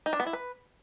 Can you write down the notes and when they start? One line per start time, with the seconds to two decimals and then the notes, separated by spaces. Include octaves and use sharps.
0.06 D#4
0.13 D4
0.20 B3
0.26 E4
0.33 B4